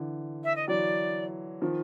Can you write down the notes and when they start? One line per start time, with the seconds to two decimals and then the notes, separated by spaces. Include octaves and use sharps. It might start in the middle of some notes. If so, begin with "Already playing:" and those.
Already playing: D3 E3
0.44 E5
0.56 D#5
0.68 E3 F#3 D5
1.62 D#3 F3